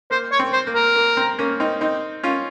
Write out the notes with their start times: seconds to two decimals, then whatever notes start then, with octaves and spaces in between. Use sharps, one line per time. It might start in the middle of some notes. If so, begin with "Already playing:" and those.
0.11 A#3 C5
0.32 C#5
0.39 C4
0.53 C5
0.67 A#3
0.75 A#4
0.96 A#3
1.17 C4
1.39 A#3 C#4
1.60 C4 D#4
1.81 C4 D#4
2.23 C#4 F4